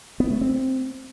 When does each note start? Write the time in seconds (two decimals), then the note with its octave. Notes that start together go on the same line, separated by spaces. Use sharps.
0.20 B3
0.31 A3
0.41 C4